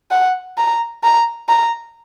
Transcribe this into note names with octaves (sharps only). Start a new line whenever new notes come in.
F#5
A#5
A#5
A#5